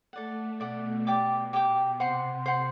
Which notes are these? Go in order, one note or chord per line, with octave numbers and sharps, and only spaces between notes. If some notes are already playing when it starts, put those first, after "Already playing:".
A3 A4 D5 F#5
B2 A4 D5 F#5
G4 D5 G5 D6
G4 D5 G5 D6
C3 C5 F#5 C6
C5 F#5 C6